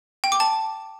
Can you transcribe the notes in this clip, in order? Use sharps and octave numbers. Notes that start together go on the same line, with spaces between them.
G5
D6
A5